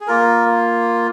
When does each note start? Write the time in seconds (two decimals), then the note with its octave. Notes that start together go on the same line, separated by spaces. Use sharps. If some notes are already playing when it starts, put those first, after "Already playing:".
0.01 G#4
0.07 A#3 F4 A#4